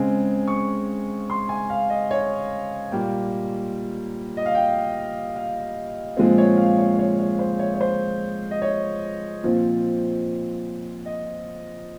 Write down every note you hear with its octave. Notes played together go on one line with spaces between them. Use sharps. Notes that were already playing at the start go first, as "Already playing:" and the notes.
Already playing: C#3 G#3 C4
C#6
C6
G#5
F5
D#5
C#5
A#2 G3 A#3 G5
D#5
F5
G5
F5
A#2 F3 G#3 C4
C#5
F5
C#5
C#5
C#5
C5
C#5
C#5
C5
D#5
C#5
A#2 F3 C4
D#5